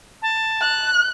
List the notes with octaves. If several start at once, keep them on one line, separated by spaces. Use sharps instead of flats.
A5
F#6